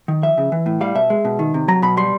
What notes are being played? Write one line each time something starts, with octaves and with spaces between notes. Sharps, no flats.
D#3
F3 E5
C#3
E3
A2
G3 F5
B2 E5
G#3
B2
D#3
C3
F#3 A#5
B2 B5
G3 C6